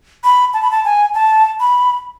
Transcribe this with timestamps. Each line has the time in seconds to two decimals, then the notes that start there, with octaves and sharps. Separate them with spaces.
0.24 B5
0.53 A5
0.62 B5
0.71 A5
0.85 G#5
1.14 A5
1.60 B5